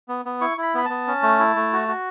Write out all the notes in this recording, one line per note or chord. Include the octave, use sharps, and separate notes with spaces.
B3
B3
E4 C#6
E4 B5
B3 B5
B3 A5
C#4
A3
E4
A3
F#4
F#4